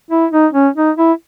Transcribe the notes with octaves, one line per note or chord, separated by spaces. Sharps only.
E4
D#4
C#4
D#4
E4